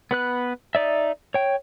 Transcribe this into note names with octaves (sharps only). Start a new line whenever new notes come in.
B3 B4 F#6
D#4 D5 E5
C#5 G5